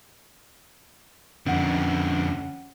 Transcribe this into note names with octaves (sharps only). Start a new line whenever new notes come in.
F2 D3 C#4 F#5